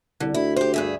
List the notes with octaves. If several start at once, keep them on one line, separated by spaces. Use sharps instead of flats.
C2 D3
D2 E4
G4 C5
G2 G#4 E5